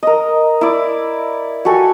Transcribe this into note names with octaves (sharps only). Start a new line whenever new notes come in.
A#4 D#5
E4 D5
F#4 G4 A4 G#5